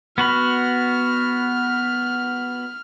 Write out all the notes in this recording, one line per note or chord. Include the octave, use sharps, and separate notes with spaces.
B3 F#4 B5 F6